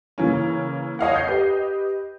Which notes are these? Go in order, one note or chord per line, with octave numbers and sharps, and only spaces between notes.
C#3 E3 A#3 C#4
C#5 D#5 F5 F#5
G6 C7
G4 B4 D#5